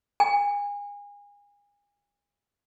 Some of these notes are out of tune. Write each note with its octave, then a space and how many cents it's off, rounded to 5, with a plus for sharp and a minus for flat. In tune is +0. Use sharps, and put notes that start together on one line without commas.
G#5 -30